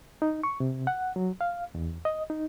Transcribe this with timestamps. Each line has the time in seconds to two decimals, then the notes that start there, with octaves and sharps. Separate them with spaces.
0.22 D#4
0.44 C#6
0.60 C3
0.87 F#5
1.16 F#3
1.41 F5
1.75 E2
2.05 D#5
2.30 D#4